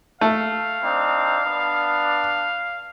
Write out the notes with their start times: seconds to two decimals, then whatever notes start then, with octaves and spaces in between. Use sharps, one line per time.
0.21 A3 F5
0.83 C4 D4 D#4
1.45 B3 D4